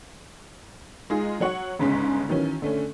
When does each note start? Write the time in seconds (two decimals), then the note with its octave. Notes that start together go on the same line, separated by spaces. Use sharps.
1.10 G#3 D#4 F4 G#4
1.40 F#3 C#5 F#5 C#6
1.79 G1 G#2 C#3 G#3 C#4 B6
2.29 D#3 E3 F#3 C#4
2.62 D3 A3 C#4